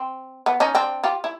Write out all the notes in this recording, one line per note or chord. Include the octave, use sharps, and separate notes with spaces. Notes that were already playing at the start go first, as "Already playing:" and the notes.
Already playing: C4
B3
C#4 D#4
C4 D4
F4 G4
E4